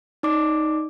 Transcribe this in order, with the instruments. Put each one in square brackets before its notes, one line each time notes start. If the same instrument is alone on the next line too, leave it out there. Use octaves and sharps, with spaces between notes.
[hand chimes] D#4 D5 D6